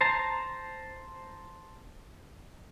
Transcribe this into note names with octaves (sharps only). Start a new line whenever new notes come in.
C5 A5 A#5